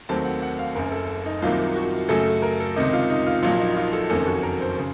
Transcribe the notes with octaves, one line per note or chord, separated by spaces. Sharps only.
D#2 D#3 F#3 A3 C4 A5
F#5
F#5
F5
F#1 F#2 C#3 A#4
A4
D#4
C2 C3 D#3 F#3 A#3 F4
F#4
F#2 C#3 F#3 A3 A4
A#4
A4
C#2 C3 D#3 D#5
F4
D#4
F4
A#1 A#2 F#3 A#3 F4
D#4
F4
A4
F#1 F2 D#3 A#3 C#4 A4
F#4
A#4
C5
C#3